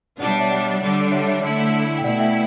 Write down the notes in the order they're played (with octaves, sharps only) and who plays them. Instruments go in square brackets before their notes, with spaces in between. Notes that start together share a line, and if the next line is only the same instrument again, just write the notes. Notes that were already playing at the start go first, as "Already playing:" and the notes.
[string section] B2 G3 D4 [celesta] D5 F#5
[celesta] C#5 E5
C#5 E5
D5 F#5
[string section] D3 G3 D4
[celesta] C#5 E5
C#5 E5
[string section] D3 A3 E4
[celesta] G5
[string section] B2 A3 E4 [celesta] D5 F#5
[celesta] E5 G5